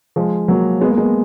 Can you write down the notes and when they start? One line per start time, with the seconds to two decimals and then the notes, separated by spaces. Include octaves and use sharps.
0.16 F3 G#3
0.48 F#3 A#3
0.81 G#3 B3
0.91 A#3
0.97 G#3 B3